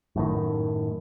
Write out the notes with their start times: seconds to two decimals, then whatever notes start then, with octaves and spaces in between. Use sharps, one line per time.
0.16 F#2 A2 D#3